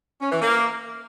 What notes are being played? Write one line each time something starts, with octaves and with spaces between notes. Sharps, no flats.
C#4
E3
A#3